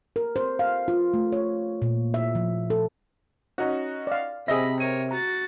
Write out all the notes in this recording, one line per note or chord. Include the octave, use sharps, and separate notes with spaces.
A#4
C5
F5
F4
A3
C#5
A#2
E5
F3
A4
C#4 D#4 F#4
D5 F5
C3 G#4 D#5 E5 B5 A#6
A#4 C#5 D#7
F#4 A#5 A6